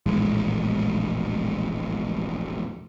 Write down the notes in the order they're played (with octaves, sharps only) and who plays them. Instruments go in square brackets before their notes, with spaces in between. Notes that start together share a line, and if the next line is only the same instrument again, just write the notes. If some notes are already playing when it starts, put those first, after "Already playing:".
[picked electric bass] E1 A#1 A2 G#3